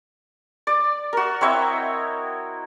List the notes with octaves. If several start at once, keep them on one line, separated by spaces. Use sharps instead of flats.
D5
F#4 A#4
C4 E4 C#5 D#5